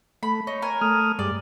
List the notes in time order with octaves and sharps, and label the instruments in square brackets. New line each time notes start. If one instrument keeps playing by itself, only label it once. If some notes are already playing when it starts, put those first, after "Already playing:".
[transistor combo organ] A3 [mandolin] B5
[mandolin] D#4 [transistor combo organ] C#5
[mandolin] A#4 G#5
[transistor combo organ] A3 D#6 F6
[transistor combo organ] G2 G#3 [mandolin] D5